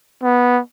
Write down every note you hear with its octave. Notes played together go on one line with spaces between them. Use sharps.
B3